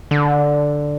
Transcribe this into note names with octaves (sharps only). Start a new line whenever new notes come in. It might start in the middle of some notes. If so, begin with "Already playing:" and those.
D3